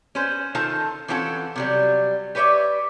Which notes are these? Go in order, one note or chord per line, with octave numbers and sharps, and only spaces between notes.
C#4 B4 C5
D#3 D#4 F4 A4 C5 A5
E3 C4 C#4 F4 A4 F#5
C3 F#3 G3
G4 B4 C#5 D5 E5